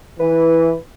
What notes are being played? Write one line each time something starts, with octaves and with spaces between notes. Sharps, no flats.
E3 B4